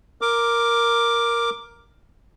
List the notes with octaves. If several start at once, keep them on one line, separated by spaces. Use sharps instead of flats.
A#4 D6